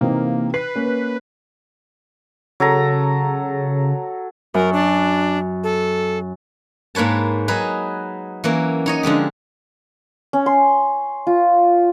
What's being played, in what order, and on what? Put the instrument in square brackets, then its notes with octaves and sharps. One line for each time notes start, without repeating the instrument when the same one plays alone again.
[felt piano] C3 E3 D#4 [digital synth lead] A#3
[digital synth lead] B4 [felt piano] C7
[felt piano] A#3 C#4
[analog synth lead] C#3 [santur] F#3 A4 A#5
[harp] F#2 [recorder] A#4
[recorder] D4
A4
[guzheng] G#2 A#3 B4 C#5 A5
F#3 D#4 G#4 B4
E3 F#3 A#3 C#4
D#4 C#5 D#5
D3 F3 G#3 G4
[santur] C#4
C6
F4